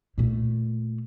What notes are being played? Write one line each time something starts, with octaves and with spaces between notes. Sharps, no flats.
A#2 A3